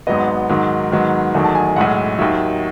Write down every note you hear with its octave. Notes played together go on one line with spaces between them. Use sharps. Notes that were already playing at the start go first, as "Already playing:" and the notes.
G#1 G#2 F#3 B3 D#5
G#2 D#3 F#3
G#2 D#3 F#3 B3
E2 D#3 F#3 A3 G#5
A5
G#5
G#5
B1 A2 G#3 F#5
D#2 D#3 F#3 E5